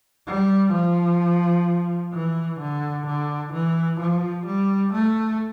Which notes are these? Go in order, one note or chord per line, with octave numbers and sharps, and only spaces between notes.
G3
F3
E3
D3
D3
E3
F3
G3
A3